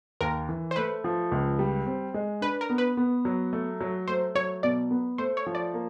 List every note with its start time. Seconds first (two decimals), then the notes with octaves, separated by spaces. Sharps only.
0.21 D#2 A#4
0.49 E3
0.71 C5
0.76 A3 B4
1.04 F3
1.31 C#2
1.59 G3
1.87 C4
2.14 G#3
2.41 D4 B4
2.61 A#4
2.70 B3
2.78 B4
2.97 B3
3.25 F#3
3.53 A3
3.81 F#3
4.08 A3 C5
4.35 F#3 C#5
4.63 B2 D5
4.91 B3
5.18 A3 C5
5.37 C#5
5.46 F3
5.55 D5
5.74 A#3